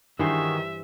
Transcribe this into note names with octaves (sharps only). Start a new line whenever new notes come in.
G2 D#3 E3 F#4 G#4 C5 E5